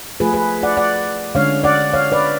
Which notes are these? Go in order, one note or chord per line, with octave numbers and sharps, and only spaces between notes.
F3 A3 F4 G#4 B4
G#4 B4
D5 F#5
D5 F#5
D3 G#3 C#4 C#5 F5
D5 F#5
C#5 F5
B4 D5